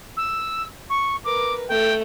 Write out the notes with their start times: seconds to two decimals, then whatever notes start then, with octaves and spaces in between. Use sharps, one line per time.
0.16 E6
0.89 C#6
1.24 A#4 B4 D6
1.68 A3 G5